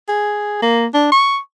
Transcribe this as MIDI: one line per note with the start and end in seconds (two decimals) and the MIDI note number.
0.08 0.59 68
0.62 0.86 58
0.94 1.07 62
1.12 1.39 85